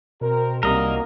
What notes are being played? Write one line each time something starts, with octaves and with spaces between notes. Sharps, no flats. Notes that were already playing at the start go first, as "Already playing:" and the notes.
B2 C4 A#4
C2 C3 D#3 F#3 G3 A#3 A#4 D#5